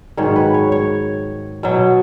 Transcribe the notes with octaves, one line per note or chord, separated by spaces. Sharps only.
G#2 D#3 F#3 C#5
B4
C#5
C#5
B2 F#3